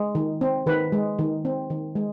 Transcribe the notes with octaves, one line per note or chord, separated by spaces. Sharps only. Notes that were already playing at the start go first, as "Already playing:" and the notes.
Already playing: G#3
D#3
C4
D#3 B4
G#3
D#3
C4
D#3
G#3